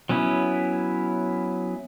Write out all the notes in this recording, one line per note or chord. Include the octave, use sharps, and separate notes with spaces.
F#3 B3 C#4 E4